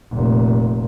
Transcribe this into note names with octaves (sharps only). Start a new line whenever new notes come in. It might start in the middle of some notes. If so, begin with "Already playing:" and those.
F1 A#2